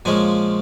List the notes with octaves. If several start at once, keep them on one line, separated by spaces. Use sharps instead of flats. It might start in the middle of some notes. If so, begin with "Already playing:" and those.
A#2 F3 G#3 C#4 G#5